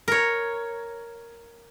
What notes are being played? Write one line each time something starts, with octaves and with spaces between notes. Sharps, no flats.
A#4 C#5